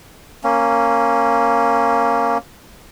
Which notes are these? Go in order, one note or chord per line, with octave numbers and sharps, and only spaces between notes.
A#3 C#4